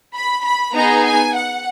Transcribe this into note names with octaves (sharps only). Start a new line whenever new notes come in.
B5
B5
B3 D#4 G#4 A#5
G#5
F#5